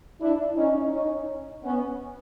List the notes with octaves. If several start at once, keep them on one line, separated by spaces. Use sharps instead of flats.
D4 E4
C#4 D#4
C#4 D#4
B3 C#4